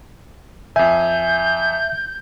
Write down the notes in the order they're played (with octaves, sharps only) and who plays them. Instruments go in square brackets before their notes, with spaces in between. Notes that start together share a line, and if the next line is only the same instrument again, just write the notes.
[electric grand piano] F2 G#5 [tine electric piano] E5 [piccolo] G6